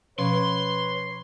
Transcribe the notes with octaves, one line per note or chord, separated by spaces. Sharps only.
B2 F3 C#4 B4 C#5 C6